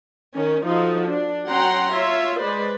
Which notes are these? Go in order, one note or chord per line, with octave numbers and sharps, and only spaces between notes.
D#3 C#4
F3 D#4 F#4 A4
D4
F#3 C#4 F#5 G5 A#5 C6
F4 C#5 E5
G#3 B4 C5 D5